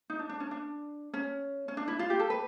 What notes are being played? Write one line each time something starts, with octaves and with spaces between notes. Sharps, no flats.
D#4
D4
D4
C#4
D4
C#4
C#4
D4
E4
F4
G4
A4
B4